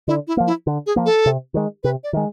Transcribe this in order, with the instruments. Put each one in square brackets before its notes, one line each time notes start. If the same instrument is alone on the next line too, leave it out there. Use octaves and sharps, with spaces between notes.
[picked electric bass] D3 [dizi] E4
[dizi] E4
[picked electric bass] F3 A#3
[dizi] E4
[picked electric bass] D3
[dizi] G#4
[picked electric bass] F3 A#3
[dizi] A4
[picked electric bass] C3
D#3 G#3
[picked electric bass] C3 [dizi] B4
[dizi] D5
[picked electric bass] D#3 G#3